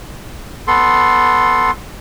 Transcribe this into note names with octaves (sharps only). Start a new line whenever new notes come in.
B3 A4 C6